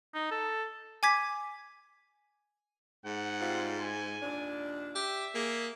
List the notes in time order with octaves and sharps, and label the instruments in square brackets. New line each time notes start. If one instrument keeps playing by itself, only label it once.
[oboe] D#4
A4
[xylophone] G#5 D6 G#6 B6
[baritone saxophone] G#2 [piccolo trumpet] F#5
[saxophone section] G3 C4 F4
[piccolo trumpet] G#5
[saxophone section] D#2 A#2 D4
[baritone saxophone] G4 [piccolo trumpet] E5
[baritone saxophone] A#3 [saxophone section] G#4